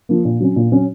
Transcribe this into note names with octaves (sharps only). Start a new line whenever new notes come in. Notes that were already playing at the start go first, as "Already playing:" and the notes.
F3 A#3
A#2
F#3 C#4
A#2
F#3 C#4